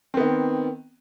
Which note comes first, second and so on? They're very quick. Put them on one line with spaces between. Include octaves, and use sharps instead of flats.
C4 B3 D#3